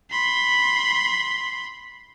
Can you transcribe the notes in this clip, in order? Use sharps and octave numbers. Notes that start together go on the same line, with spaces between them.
B5 C6